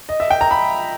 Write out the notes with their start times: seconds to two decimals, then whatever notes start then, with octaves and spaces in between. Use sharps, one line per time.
0.09 D#5
0.20 E5
0.31 G5
0.41 A#5
0.51 B5